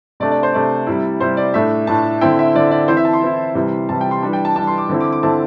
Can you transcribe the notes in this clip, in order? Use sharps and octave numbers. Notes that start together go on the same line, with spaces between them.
C3 A3 D4 D5
D5
C5
C3 A3 D4 D5
C3 G3 E4
C3 G3 E4 C5
D5
A2 A3 D4 E5
A2 A3 D4 A5
D3 C4 E4 G5
E5
D3 C4 E4 D5
D5
E3 C4 E4 C5
E5
A5
C6
E3 C4 E4
C3 E3 G3
C3 E3 G3 A5
G5
C6
E3 G3 D4 A5
G5
A5
E3 G3 D4 A5
C6
D6
D3 C4 E4
D6
D6
D3 C4 E4 A5